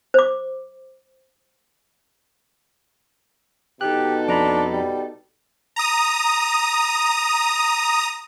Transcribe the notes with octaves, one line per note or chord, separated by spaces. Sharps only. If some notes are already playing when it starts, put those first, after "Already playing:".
C5 D6
B2 D#4 G4 A4 F#6
F2 D4 A#5 B5
G3
A#5 D#6